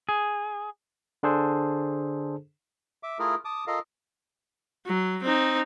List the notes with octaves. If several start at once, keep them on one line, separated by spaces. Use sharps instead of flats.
G#4
D3 D4 G#4 A4 C5
E5 D6
A3 E4 F4 G#4 A#4
A5 D6 D#6
F4 A4 A#4 D#5 F5
F#3
C4 D#4